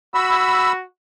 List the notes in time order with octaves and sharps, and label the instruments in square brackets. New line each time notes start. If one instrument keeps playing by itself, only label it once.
[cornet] F#4 [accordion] B5 E6